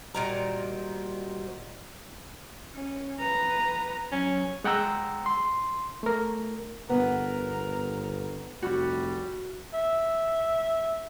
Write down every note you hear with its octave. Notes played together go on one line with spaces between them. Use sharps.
A#2 D#3 G3 F#4 C5 A#5
C#4
B4 A#5
F#3 C#4
G#3 F#5 G5 A#5 E6
C6
A3 A#4
G1 B3 A#4
F1 G3 F#4
E5